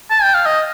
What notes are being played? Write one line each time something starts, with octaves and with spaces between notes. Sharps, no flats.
A5
G5
F5
D#5